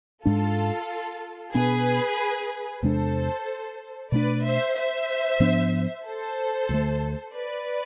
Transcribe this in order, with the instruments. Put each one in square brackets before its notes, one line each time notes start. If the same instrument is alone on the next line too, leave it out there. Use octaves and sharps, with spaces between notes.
[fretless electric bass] G#2 G#3 D4 [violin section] F4 A4
[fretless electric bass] B2 B3 D4 [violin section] G#4 B4
[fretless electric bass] E2 C3 G#3 D4 [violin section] A4 C5
[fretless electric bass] B2 A3 D4 [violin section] B4 D5
[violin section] C5 E5
C5 E5
[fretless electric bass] G#2 F3 B3 D4
[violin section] A4 C5
[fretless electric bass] D2 D3 A3
[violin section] B4 D5